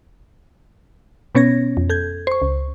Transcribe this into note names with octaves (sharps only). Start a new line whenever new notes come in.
B2 B3 C#4 C#5 G#6 A#6
F2
A4 G6 G#6
C5 C#6
C#2